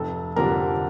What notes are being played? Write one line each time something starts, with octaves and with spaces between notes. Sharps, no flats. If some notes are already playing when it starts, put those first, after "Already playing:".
Already playing: F1 A4
F2 D3 G3 D4 A#4